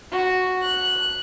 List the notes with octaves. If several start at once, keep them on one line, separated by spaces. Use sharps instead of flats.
F#4
F#6